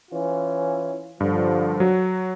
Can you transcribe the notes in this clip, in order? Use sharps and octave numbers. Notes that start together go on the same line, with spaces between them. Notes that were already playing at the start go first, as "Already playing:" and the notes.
E3 C#4 F4
G2 D3 F3
F#3 F#4